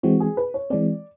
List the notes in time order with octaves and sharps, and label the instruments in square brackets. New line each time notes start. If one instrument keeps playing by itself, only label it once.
[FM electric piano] E3 G#3 C4 [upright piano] F#4
[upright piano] G#4
B4
C#5
[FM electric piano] E3 G#3 C4 [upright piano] D5